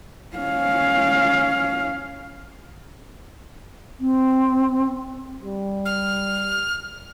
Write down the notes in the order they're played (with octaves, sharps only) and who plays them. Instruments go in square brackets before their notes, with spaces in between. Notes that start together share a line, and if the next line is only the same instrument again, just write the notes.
[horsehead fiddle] C#4 F5
[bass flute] C4
[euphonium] G3
[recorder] F6